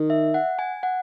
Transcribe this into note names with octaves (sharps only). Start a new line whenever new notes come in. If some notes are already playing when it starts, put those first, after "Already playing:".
Already playing: D#3
E5
F#5
G#5
F#5